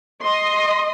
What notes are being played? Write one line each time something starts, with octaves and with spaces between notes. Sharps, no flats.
D#5 C6